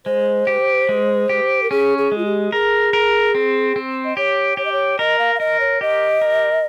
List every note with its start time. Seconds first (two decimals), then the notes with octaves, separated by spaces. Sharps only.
0.06 G#3 C5
0.47 G4
0.89 G#3
1.29 G4
1.63 A#4
1.71 C#4 G#4
1.98 G#4
2.12 G#3
2.18 F4
2.25 G4
2.52 G#4 A#4
2.93 A#4
3.35 C4
3.76 C4
4.05 D#5
4.17 G4 C#5
4.57 G4 C#5
4.65 D#5
4.72 C#5
4.99 A#4 D#5
5.19 F5
5.35 F5
5.40 A#4 D#5
5.60 C#5
5.81 G4 D#5
6.21 A#4